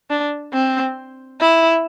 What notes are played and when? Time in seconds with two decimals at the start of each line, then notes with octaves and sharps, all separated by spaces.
0.10 D4
0.53 C4
1.41 E4